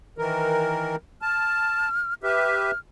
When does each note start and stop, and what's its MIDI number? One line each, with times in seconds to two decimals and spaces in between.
0.18 0.96 51
0.18 0.96 52
0.18 0.96 70
1.22 1.89 81
1.22 2.14 89
2.23 2.71 67
2.23 2.71 71
2.23 2.71 76
2.23 2.79 89